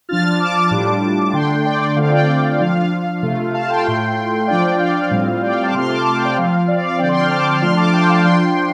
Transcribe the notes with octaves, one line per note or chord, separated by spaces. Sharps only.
F3 D4 F4 F6 A6
F6 A6
A5 D6
A5 D6
A2 G3 D4 F4
D3 A3 D4 G5 C6
D5 G5
D5
D3 A3 C4 F4 F5
D5 G5
D5 G5
F3 D4 F4 F5
F5
C3 A3 F4
F5 A5
G5 C6
A2 A3 F4
F3 D4 F4 D5 G5
F5
F5
A2 G3 C4 F4
D5 G5
F5
A5 D6
C3 A3 C4 F4 C6 F6
A5 D6
A5 D6
G5 C6
D5 G5
F3 C4 F4 F5
D5
F5
F5
D3 F3 C4 D5 G5
G5 C6
F6
A5 D6
F3 A3 D4 F4 C6 F6
A5 D6
G5 C6
F5 A5
F3 D4 F4 G5 C6